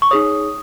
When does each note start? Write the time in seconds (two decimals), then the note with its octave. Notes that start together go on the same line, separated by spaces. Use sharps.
0.02 C#6
0.11 D#4 G#4 C#5 D#6